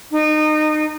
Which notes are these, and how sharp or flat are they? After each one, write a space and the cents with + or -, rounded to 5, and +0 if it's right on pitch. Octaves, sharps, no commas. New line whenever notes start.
D#4 -25